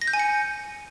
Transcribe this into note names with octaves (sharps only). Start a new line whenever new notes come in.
A#6
G6
G#5
C#7